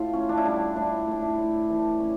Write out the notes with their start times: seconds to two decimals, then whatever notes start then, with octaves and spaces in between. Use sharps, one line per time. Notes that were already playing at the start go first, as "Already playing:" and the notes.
Already playing: A2 F4
0.13 C#4
0.29 D4
0.37 E4
0.44 G3 D4
0.76 A2 D4
1.07 A2 D4
1.22 E4
1.38 A2
1.69 E3 D4
2.00 C#4